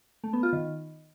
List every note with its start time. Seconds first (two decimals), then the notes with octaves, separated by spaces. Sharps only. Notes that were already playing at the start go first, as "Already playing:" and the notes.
0.24 A3
0.33 B3
0.43 F4
0.53 D#3